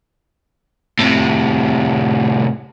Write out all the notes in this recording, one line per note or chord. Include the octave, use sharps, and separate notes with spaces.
A2 C3